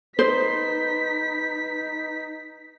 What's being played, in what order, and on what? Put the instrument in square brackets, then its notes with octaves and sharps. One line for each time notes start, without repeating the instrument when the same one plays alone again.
[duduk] D#4 [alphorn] B4 [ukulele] C5 [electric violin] B6